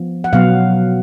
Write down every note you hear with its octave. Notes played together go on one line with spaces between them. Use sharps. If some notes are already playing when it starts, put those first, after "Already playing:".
Already playing: F3 B3
F#5
B2 F#3 B3 F5